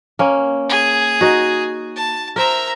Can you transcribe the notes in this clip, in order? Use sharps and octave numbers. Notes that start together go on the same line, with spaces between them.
A#3 C#4
G#4
D#4 F#4
A5
A#4 C5 E5 A#5